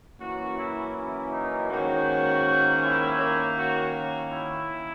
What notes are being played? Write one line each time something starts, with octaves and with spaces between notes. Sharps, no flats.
F#2 E3 A#3 C#4 F#4
E4
E4
D#4
G#2 D#3 A#3 C#4 F#4
E4
D#3 A#3 C#4
F#4
E4